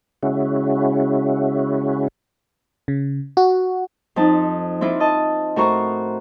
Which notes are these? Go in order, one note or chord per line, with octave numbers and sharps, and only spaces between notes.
C#3 G#3 C#4 E4 F#4
C#3
F#4
F2 C4 D#4 A5
C4 D4 E4 F4
D#5 A5
A2 F#4 A#4 C5 A#5 C#6